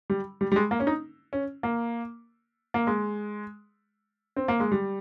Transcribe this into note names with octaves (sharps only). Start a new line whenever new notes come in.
G3
G3
G3
G#3
A#3
C#4
D#4
C#4
A#3
A#3
G#3
C4
A#3
G#3
G3